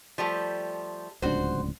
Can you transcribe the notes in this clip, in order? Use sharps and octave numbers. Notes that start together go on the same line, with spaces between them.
F3 G3 A3
D1 C#2 D4 F#4 C5